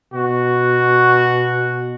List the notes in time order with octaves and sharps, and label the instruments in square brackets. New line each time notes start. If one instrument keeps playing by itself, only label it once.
[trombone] B2 [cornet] F#4